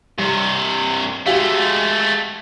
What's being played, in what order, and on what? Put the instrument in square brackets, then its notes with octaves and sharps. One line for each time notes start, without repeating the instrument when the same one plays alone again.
[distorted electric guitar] G2 C3 [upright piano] G3
[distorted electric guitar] G#3 A3 [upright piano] F#4 G4 F5